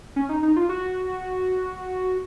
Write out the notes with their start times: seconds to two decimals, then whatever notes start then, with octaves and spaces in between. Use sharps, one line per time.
0.16 C#4
0.29 D#4
0.43 D#4
0.56 F4
0.69 F#4